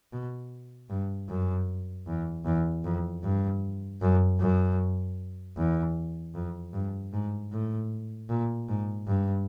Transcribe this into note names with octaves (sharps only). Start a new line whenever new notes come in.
B2
G2
F#2
E2
E2
F2
G2
F#2
F#2
E2
F2
G2
G#2
A2
A#2
G#2
G2